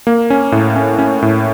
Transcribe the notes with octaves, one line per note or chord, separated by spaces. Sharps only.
A#3
C#4
A2
C#4
C#4
A2